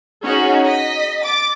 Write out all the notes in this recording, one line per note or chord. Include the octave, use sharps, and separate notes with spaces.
C#4 D#4 F#4 G#4
D#5 B6
D6 A6